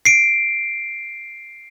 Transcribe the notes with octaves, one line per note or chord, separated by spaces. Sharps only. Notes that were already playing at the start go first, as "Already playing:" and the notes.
C7 D7